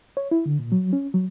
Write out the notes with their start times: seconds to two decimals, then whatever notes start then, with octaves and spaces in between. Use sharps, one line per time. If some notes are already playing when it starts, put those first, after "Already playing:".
0.17 C#5
0.31 E4
0.46 D3
0.59 A#2
0.72 F#3
0.93 C#4
1.14 F#3